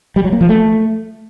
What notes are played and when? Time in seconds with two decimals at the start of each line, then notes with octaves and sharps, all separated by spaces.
0.16 G3
0.24 F#3
0.33 A#3
0.41 F3
0.49 A3